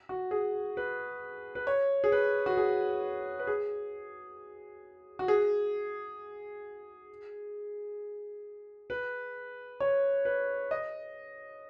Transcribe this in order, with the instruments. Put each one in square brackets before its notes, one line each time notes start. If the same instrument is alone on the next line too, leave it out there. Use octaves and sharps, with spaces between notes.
[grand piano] F#4
G#4
B4
B4
C#5
G#4
B4
F#4
G#4
B4
G#4
F#4
G#4
B4
C#5
B4
D#5